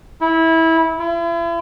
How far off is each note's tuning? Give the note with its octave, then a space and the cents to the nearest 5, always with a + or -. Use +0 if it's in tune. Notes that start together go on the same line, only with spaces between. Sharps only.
E4 -20
E4 +40